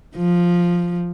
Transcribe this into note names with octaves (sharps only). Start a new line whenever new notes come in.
F3